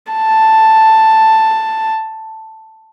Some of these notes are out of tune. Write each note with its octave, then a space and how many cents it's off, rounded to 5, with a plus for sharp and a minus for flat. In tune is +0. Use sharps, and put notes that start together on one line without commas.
A5 +5